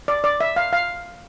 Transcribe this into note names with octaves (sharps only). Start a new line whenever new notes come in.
D5
D5
E5
F5
F5